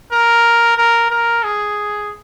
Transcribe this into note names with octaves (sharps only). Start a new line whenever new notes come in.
A#4
A#4
A#4
G#4